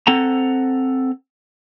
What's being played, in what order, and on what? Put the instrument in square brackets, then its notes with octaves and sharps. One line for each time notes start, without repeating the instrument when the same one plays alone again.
[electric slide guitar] C4 A4 F#5 A#5